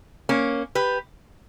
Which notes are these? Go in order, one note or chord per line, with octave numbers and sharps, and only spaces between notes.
A#3 C#4
G4 B4